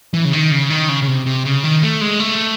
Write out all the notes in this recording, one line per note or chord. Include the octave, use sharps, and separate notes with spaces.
E3
C#3
D#3
C#3
D#3
C#3
C#3
C3
C3
C#3
D#3
A3
G#3
A3